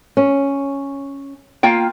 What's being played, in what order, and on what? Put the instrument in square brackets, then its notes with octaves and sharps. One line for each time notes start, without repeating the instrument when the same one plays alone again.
[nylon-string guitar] C#4
[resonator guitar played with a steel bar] A#3 F4 G5